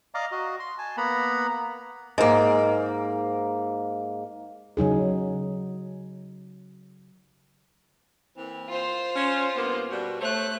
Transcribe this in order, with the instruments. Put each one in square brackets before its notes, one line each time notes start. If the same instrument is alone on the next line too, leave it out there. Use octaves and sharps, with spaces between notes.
[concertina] D5 D#5 F5 A#5 D6
F#4 D#5
C6
G#5 A5
A#3 B3 F#5 A#5 B5
[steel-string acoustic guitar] G#2 A#3
[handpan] C#3 F#3 D#4 G#4
[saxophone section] E3 A#3 C4
[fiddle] F4 C5
[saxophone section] C#4
G2 A#3 B3
B2 G3 F#4
[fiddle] A3 F#6 [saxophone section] A4 C5 C#5